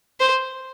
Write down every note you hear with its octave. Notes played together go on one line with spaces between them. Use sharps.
C5